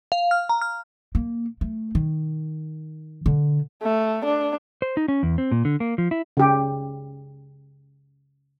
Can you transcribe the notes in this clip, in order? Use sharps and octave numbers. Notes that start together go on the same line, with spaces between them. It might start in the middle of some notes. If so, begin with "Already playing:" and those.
F5
F6
A#5
F6
A#3
A3
D#3
D3
A3
D4
C5
D#4
C#4
E2
C4
A#2
D3
A#3
F3
E4
C#3 G4